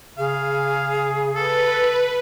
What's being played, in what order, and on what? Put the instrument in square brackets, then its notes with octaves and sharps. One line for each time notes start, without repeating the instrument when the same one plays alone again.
[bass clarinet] C#3 [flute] G#4 [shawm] F5
[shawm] A4 [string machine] B4